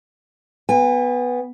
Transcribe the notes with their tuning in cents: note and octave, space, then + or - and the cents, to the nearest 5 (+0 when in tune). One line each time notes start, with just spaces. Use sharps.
B3 +0 G#5 -40